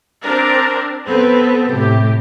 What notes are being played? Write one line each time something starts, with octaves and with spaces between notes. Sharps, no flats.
C4 D4 A#4
B3 C4 A4 B4
A2 C3 G4